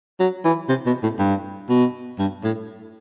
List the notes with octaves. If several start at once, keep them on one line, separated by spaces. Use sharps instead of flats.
F#3
E3
C3
B2
A2
G2
B2
G2
A2